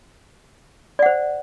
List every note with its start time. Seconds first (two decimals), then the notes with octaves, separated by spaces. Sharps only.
0.99 D5
1.02 F#5
1.06 C5